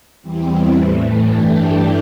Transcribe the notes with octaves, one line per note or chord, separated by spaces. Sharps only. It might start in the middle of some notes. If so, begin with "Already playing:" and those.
E2 E3 G3 C4
A2 E3 A3
G2 E3 A3 D4 G4